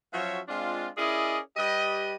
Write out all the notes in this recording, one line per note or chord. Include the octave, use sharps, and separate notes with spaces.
F3 F#3 C#4 F#4 C#5 E5
G#3 C4 D4 F4
C#4 E4 G#4 A#4 D5 D#5
G3 G4 B4 D#5